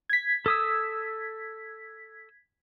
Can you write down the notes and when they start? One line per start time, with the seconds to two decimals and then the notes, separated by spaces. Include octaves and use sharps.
0.10 G#6 B6
0.46 A4 D#6 E6